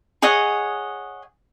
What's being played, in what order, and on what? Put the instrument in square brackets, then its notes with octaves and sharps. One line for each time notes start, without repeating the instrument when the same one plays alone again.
[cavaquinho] G#4 C#5 D#5 F#5